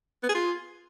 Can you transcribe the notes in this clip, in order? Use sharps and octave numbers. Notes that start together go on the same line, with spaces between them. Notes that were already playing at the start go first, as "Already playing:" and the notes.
B3
G#4
F4